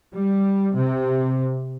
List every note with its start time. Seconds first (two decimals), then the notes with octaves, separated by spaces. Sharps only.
0.15 G3
0.75 C3